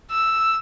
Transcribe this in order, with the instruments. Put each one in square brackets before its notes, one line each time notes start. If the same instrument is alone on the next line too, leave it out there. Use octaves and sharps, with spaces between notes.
[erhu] E6